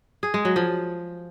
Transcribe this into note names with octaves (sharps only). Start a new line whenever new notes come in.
G#4
G#3
F#3
F3